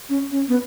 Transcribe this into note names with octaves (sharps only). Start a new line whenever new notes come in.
C#4
C#4
B3